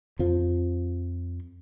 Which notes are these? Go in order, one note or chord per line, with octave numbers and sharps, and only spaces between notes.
F2 F3